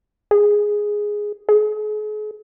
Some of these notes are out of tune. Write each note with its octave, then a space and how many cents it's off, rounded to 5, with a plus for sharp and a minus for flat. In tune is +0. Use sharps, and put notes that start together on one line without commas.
G#4 +0
G#4 +40